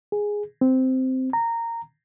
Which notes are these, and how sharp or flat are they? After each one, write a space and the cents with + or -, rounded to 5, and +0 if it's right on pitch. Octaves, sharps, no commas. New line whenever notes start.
G#4 -5
C4 -10
A#5 -15